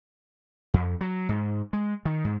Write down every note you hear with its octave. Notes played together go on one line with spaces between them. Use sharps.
F2
F#3
G#2
G#3
D#3
G#2